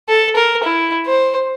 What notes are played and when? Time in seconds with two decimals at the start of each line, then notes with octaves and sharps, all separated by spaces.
0.09 A4
0.36 A#4
0.64 E4
1.06 C5